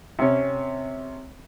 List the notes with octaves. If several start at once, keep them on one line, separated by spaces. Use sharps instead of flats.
C3 C#4